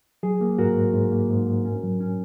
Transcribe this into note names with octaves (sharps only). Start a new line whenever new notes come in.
F#3 G#4
A#3
G#2 F#4 A#4
G#2
G#2
A#3
G#2
G#2
C#4
F#3
C#4